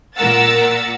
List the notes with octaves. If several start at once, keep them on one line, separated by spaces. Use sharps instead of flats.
A#2 A#4 F#5 E6 A6